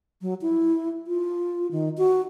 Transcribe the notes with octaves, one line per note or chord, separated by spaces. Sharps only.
F#3
E4
F4
D#3
F#4